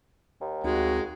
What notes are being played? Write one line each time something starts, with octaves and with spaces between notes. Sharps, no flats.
D#2
D2 G#3 C4 D#4 F#4